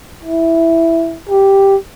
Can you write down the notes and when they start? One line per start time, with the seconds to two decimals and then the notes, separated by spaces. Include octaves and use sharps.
0.24 E4
1.29 G4